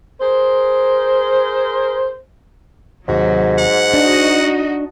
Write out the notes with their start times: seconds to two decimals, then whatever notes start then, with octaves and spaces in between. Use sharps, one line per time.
0.21 G#4 A#4 C5
3.08 D#2 G#2 C3 F#3 F#4
3.59 F#5
3.94 D4 D#4 F#4 D#5